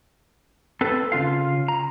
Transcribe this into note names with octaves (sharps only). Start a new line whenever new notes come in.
C4 A4 B4
C#3 E3 F4 F5
A#5